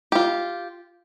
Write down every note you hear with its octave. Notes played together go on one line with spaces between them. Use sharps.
F4 G4